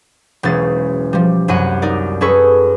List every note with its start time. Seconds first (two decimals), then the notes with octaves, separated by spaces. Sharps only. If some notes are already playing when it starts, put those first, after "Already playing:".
0.43 E1 B1 B2 G#3 C#4 A6
1.13 F3 G3
1.48 C2 F#2 F#3 G3 F#5 D#7
1.82 D#4 A#4 D5
2.21 F#2 G#4 A4 B4 C#6